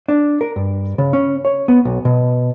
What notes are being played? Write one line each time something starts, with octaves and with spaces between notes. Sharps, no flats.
D4
A#4
G2
C#3
C#4
C#5
B3
B1
B2